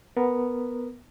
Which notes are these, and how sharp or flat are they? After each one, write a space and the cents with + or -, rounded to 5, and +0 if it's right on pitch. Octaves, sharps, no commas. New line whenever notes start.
B3 +0 A#4 +0